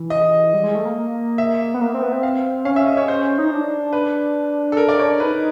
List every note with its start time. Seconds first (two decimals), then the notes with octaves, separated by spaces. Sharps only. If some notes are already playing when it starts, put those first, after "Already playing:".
Already playing: E3
0.10 D#5
0.53 G3
0.63 G#3
0.75 A3
0.85 A#3
1.38 E5
1.74 B3
1.81 A#3
1.94 C4
2.02 B3
2.12 C4
2.23 F5
2.65 C#4 F5
2.76 E5
2.86 D#5
2.97 C#5
3.08 C5
3.38 D#4
3.51 D4
3.93 B4
4.72 A4
4.77 A#4
4.89 D5
4.99 C#5
5.20 D#4 B4